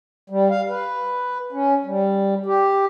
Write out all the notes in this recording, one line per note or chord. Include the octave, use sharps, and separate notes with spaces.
G3
F5
B4
C#4
G3
G4